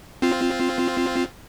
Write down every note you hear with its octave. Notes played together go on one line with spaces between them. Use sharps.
C4 F4